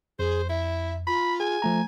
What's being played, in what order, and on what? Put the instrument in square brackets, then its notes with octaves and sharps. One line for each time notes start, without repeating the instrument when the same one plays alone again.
[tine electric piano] F2 [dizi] G#4 [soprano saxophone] C5
[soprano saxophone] E4 [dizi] E5
[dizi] F4 [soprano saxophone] B5
[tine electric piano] G#4 [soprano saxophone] G#5
[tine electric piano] F3 A3 A#5